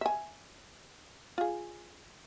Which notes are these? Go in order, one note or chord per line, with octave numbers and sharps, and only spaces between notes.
E5 G#5
F4 G#4